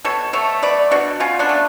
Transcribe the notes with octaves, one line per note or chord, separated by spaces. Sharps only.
B2 A4 C#5
A3 A4 C#5
F#3 B4 D5
B2 D4 F#4
B2 C#4 F4
B3 D4
A3